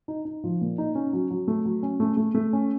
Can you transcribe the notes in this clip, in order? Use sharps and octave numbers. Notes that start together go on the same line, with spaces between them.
D#4
D#4
F3
A#2
D#4
C#4
F#3
F#3
A3
F#3
C#4
A3
A3
A3
C#4